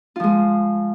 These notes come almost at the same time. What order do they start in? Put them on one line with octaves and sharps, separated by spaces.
F4 F3 G#3